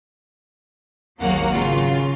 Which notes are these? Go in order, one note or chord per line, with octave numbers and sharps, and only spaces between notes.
G#1 D#2 F#3 A#3 F#5
C#3 F#3 F4